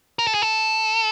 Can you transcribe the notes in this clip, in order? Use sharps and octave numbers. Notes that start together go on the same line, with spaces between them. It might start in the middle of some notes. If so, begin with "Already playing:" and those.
A#4
A4
G#4
A4